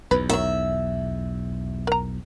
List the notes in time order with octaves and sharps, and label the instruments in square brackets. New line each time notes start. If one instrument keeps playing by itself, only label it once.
[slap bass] B1 E2 [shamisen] B4
[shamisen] D#3 F#3 [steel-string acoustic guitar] E5
[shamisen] A#4 A#5